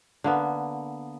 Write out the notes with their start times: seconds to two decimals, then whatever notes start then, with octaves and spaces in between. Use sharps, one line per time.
0.24 D3 A#3 B3